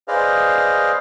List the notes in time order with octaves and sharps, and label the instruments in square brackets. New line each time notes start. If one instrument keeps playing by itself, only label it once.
[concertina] G#4 B4 C5 D5 D#5 F5